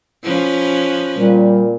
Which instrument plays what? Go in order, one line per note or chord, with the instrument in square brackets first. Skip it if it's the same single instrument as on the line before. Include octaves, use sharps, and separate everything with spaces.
[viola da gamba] F3 C#4 B4
[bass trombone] A#2 [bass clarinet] G3